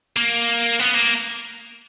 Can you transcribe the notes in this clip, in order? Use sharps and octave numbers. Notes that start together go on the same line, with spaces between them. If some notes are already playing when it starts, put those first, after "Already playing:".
A#3
B3
A#3